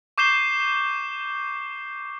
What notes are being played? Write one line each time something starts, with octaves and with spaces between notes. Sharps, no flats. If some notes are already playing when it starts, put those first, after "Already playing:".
C#6 D6 G6 C7 E7 G7